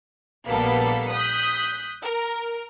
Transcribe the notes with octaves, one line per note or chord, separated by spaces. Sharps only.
A#1 G3 A#3 B3 A4 B6
D#6 F#6 G6 B6
A#4